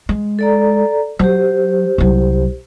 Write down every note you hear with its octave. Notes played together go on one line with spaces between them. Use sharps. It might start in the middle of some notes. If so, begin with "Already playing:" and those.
G#3
A4 D5 A#5
F#3 G4 C5
C2 F#3